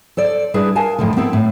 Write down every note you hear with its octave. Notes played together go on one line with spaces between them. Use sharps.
A4 C5 D5
G3 D4 E4 G#4 B4 D5
A#4 F5 G#5 A5
F2 A2 D3
B3 C4 E4 A4 A#4
A2